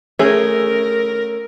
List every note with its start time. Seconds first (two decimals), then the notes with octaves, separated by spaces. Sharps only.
0.19 A3 C#4 G#4 A#4